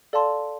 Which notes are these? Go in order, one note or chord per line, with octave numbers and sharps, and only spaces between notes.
A4 D5 F5 A5 C6